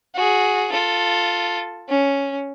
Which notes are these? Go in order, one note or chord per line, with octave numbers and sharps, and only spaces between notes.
F#4 G#4
F4 A4
C#4